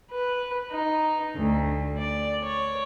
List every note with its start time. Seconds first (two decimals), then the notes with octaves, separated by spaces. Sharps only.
0.10 B4
0.70 D#4
1.35 D2
1.98 D5
2.44 C#5